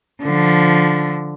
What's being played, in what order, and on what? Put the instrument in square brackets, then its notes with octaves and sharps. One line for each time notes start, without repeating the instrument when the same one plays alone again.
[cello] D3 F3